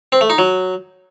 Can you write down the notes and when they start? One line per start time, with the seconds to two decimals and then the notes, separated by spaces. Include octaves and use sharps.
0.12 C4
0.21 A3
0.30 D#4
0.38 F#3